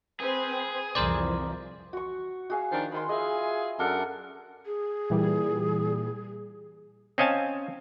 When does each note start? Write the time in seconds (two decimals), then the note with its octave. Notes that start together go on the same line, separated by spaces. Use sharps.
0.20 C4 G#4 B4 C5
0.95 C2 F2 E3 A#4 C5 D5
1.93 F#4 C#6
2.50 F#4 G#4 F5
2.72 D#3 F3 D4
2.92 D#3 B5 C6
3.09 F4 G#4 D#5 E5
3.79 F#2 D4 A4 A#4 F#5
4.66 G#4
5.10 A#2 E3 G3
7.18 C4 C#4 D#5 F5 G#5 A5